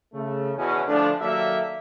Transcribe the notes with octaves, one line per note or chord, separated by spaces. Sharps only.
C#3 A3
E2 B2 C#4
D3 F3 A3 D4
D#2 F#3 A#3 A4 D5 E5